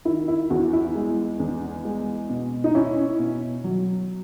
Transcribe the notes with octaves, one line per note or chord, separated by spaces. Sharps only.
D#3 E4
E4
E2 F#4
E4
G#3
E2
G#3
B2
D#4
C#4 E4
B2
F#3